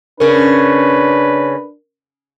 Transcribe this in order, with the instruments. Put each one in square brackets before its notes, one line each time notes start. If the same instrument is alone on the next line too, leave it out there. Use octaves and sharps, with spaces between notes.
[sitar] C#3 C#4 [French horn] D4 [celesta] A#4 [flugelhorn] B4